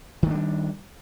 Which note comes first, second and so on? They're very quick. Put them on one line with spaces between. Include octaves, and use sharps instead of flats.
D#3 A3 D4 G3